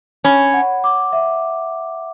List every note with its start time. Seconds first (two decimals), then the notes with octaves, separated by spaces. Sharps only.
0.24 C#4 B5
0.54 F#5
0.84 D6
1.13 E5